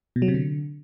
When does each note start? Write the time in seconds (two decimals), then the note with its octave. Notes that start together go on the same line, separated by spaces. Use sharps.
0.16 B2
0.22 F#3
0.28 C3
0.34 D3